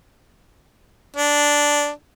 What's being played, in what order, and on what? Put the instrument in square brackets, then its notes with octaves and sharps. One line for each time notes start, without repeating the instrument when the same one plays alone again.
[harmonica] D4